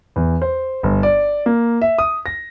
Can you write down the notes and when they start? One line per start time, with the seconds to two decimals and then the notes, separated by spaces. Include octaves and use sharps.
0.16 E2
0.42 C5
0.83 G1
1.03 D5
1.46 A#3
1.82 E5
1.99 D#6
2.26 A#6